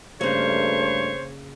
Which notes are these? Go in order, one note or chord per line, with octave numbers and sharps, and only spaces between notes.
G2 C#3 A3 A#3 C5 C#5